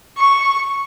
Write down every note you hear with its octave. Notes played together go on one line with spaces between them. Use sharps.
C#6